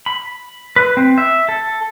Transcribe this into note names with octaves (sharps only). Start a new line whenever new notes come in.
B5
B4
C4
E5
A4